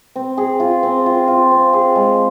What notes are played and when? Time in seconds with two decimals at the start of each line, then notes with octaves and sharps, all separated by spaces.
0.16 C4
0.37 G#4
0.60 F4
0.83 C4
1.06 F4
1.28 F4
1.51 C4
1.73 G#4
1.96 G#3